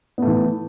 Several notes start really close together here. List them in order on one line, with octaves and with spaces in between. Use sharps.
B3 A3 E3